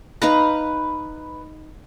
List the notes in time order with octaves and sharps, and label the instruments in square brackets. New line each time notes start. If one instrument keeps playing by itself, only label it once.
[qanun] D#4 F5 A#5 [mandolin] B4